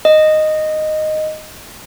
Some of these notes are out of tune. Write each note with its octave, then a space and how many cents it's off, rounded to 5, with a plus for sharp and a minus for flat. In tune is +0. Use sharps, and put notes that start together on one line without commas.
D#5 -5